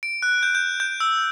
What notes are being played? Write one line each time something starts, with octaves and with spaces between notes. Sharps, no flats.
D7
F#6
G6
G6
G6
E6